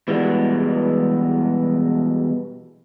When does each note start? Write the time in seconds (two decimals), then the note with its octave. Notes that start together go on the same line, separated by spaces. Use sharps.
0.08 B2 E3 G3 G#3 A#3 B3